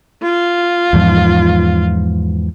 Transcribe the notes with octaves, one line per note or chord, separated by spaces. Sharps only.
F4
E2 G#2 F3